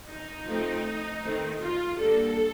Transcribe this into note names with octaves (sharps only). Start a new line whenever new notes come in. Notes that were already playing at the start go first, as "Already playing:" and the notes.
D#4
F3 A3 C4
D#3 A3 C4
F4
D3 G3 A#3 D4 A4